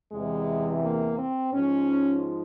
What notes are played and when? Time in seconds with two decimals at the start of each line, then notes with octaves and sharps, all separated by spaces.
0.11 E2 C3 E3 G#3
0.83 A#3
1.17 C4
1.53 G#2 F3 C#4